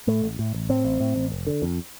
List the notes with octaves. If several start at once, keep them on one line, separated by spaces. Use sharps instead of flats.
A2 A3
A1
A2
A1
A2 C4
A1
A2
A1
F1
D3
F2